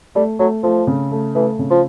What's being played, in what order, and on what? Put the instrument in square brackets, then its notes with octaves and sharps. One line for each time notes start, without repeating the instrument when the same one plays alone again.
[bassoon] G3 [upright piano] A3
[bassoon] F#3 [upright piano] A3
[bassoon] F3 [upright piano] A3
[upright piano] C#3
A3
[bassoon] E3 [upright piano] A3
[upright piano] C#3
[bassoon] F3